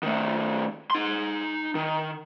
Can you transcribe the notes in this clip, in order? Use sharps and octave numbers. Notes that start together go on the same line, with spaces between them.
D#3 A3
D#4 C6
D#3